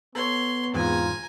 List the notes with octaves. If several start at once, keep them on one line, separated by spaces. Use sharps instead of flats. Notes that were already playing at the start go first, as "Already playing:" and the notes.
B3 A4 C#5 C6
E2 G#2 C4 F4 G#5 A#5